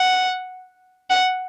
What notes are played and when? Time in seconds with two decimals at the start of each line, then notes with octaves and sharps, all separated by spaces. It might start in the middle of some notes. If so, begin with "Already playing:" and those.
Already playing: F#5
1.10 F#5